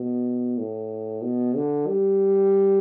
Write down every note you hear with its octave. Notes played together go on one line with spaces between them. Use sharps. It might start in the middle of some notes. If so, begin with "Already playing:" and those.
Already playing: B2
A2
B2
D3
G3